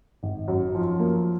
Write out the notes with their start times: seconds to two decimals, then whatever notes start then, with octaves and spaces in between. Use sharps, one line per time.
0.23 G#1
0.48 F#2
0.75 F3
1.00 A#3